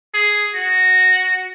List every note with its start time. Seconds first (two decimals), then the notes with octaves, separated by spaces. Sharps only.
0.14 G#4
0.55 F#4